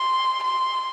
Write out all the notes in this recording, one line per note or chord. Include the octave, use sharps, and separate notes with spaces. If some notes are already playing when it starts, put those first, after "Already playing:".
Already playing: C6
C6